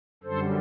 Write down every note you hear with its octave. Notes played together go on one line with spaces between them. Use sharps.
F#2 D3 G3 A4 C5